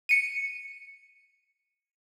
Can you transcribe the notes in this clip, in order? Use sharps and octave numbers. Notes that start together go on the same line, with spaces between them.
C#7 D#7